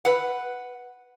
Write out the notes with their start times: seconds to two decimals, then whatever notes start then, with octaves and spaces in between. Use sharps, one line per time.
0.05 B4 F#5